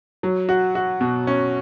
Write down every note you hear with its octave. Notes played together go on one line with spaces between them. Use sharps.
F#3
F#4
F#4
B2
C#4